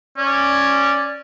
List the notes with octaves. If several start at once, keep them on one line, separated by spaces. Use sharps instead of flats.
C#4 D5